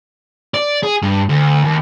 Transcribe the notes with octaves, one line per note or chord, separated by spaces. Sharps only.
D5
G#4
G2
D2
D#2